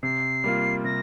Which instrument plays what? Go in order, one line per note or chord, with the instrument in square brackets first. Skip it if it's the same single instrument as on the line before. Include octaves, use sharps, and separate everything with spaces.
[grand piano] C3 [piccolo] C7
[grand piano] G3 A#3 F4
[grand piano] C3 [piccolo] A#6